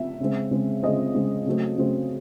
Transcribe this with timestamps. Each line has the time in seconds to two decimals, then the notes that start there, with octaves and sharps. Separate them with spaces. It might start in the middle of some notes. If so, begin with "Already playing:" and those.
Already playing: E5
0.20 C#3 G#3 C4
0.51 C#3 G#3 C4
0.82 C#3 G#3 C4 D#5
1.14 C#3 G#3 C4
1.46 C#3 F#3 A3 C4
1.78 C#3 F#3 A3 C4